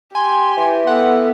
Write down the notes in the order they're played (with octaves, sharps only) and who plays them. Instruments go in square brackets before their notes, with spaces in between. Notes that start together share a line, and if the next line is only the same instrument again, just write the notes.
[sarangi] G4 [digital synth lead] G#5 [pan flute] C6
[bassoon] E3
[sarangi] B3 [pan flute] A4 [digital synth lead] F#5